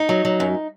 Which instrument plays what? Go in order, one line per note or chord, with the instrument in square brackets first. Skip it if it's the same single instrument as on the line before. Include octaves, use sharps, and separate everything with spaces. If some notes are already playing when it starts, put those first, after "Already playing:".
Already playing: [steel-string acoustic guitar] D#4
F#3
F#3
F#2